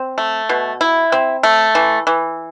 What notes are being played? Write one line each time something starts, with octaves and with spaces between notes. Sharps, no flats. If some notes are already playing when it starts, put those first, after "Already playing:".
Already playing: C4
A3
B2
E4
C4
A3
E3
E3